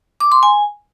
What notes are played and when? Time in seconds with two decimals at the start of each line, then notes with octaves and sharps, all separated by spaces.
0.20 D6
0.32 C6
0.43 G#5